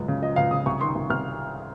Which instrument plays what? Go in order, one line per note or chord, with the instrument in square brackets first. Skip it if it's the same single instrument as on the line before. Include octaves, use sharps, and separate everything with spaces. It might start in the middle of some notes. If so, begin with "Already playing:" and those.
Already playing: [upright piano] C#2 F#2 G#3
C#3
F3 D#5
C#2 F5
C#3 D#6
C2 C#6
D#3 C6
C2
C2 F6